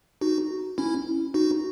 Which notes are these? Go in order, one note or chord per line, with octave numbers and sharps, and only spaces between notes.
D#4 F#4
C#4 E4
D#4 F#4